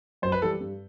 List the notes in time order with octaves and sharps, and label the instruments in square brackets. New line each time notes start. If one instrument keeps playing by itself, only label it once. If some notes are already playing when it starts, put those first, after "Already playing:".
[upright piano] F#2 [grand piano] C5
[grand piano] B4
[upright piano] E3 G3 [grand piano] A4
[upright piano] G2